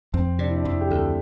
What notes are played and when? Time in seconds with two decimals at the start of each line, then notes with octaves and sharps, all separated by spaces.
0.14 F2 C4
0.39 C3 D4
0.48 E4
0.56 D4
0.65 F2 E4
0.81 G4
0.90 D2 A4